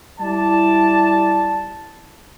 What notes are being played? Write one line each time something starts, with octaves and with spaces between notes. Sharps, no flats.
G3 E4 D5 A5